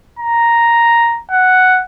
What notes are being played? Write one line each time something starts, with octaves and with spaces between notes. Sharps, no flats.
A#5
F#5